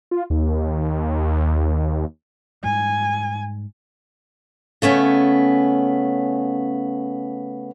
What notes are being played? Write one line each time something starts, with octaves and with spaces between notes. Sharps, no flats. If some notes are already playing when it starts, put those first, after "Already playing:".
F4
D#2
G#2 G3 G#5
C#3 A3 B3 C#4